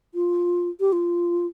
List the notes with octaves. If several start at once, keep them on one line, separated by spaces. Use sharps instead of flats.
F4
G4
F4